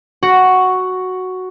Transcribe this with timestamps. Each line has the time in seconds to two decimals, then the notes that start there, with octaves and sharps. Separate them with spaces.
0.23 F#4